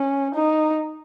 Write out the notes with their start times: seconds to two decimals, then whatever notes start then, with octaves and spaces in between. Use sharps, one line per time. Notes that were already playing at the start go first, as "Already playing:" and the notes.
Already playing: C#4
0.35 D#4